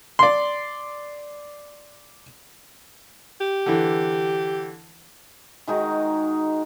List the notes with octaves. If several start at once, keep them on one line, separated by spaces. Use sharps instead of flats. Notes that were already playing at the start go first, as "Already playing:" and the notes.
D5 C6
G4
D3 E3
D#3 G#3 D#4 F#4